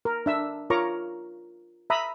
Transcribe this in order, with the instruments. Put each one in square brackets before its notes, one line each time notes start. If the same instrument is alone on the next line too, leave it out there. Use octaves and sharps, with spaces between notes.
[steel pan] A#4
D4 E5 E6
F4 A#4 C#5 A#5 C#6 D6
E5 A#5 B5 D#6